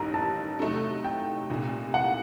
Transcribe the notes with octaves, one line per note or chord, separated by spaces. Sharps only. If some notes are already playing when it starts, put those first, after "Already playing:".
Already playing: A1 G2 D#3 A#5
A5
C3 F#3 A3 D#4 A4
G5
C2 A#2 A3 D#4
F#5